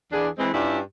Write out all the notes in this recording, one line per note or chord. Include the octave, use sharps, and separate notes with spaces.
E2 D4 G#4
E3 G#3 C4
G2 C#4 D4 E4 F4 G4